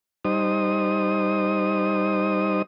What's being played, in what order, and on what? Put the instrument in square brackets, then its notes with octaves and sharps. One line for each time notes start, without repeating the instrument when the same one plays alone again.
[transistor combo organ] G3 D#4 C5 D#6